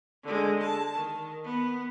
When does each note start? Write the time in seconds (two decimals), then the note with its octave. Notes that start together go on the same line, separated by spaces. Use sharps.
0.24 D3 G#3
0.63 A5
0.95 D#3
1.45 B3